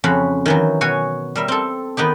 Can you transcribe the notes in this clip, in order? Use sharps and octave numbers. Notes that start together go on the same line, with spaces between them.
F2 C#3 F#4 B5
D#3 E3 F#3
B2 F#4 C#5 G#5
G3 A#4 E5
C4 A4
D#3 B3 D#4 G4